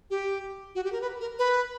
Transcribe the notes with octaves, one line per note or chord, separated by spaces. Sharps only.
G4
F#4
G4
A#4
B4
A#4
B4